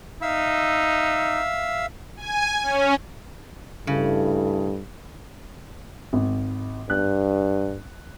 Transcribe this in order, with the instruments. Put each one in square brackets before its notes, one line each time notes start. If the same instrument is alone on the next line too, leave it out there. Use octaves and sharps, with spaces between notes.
[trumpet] D#4 [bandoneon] E5 F5 E6
[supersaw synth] G#5
C#4
[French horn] G2 [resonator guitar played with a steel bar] C#3 [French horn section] A3 E4 A4
[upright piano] G#1
[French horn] G2 [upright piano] F#6